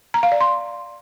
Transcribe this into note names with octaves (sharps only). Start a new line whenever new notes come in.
A#5
F5
D5
C6